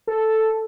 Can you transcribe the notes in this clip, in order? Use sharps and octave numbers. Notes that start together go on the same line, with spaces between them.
A4